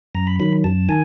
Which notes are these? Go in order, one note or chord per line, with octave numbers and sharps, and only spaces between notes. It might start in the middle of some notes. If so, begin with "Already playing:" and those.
F#2 A#5
B5
D#3 F#3 B5
F#2 A5
D#3 G#5